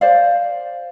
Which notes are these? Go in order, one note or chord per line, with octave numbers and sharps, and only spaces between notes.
C5 D5 F5